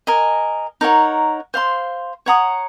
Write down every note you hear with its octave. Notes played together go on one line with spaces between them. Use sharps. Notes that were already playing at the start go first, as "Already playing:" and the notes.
A#4 D#5 G#5
D#4 A#4 C#5 F#5
C5 F5 C6
C#5 F#5 A#5 D#6